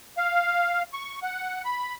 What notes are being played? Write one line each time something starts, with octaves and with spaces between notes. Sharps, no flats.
F5
C#6
F#5
B5